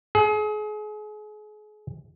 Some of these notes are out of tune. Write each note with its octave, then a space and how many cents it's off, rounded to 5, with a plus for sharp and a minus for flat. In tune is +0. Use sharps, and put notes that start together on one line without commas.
G#4 +35